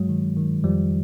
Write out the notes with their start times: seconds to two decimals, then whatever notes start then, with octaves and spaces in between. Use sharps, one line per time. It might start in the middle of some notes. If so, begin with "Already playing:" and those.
Already playing: G2 F#3 G#3
0.09 D#3
0.37 D#3
0.64 F2 F3 G3